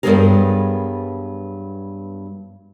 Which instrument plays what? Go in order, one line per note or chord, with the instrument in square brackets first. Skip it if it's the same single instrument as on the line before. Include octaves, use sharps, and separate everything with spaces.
[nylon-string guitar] G2 E3 F#3 B3 G#4 A#4